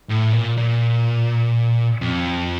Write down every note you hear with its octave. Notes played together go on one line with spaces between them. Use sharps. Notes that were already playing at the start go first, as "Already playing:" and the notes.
A2
A#2
A#2
F2